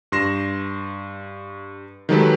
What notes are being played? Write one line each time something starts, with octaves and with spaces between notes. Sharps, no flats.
G2 C6 A#6 E7
D#3 F#3 G#3 G4 A4 B4